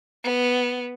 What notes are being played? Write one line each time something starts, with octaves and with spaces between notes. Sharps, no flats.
B3